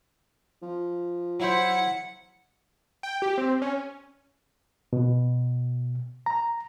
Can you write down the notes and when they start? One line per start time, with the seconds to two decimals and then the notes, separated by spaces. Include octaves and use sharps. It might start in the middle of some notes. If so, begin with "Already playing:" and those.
0.63 F3
1.40 F#3 E4 C5 F#5
3.03 G5
3.22 G4
3.38 C4
3.62 C#4
4.93 B2
6.26 A#5